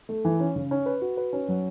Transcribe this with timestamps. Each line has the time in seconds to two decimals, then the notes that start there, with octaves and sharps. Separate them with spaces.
0.09 A3
0.25 E3
0.40 C#4
0.56 C#3
0.71 C#4
0.86 B4
1.02 F#4
1.17 B4
1.33 C#4
1.48 F#3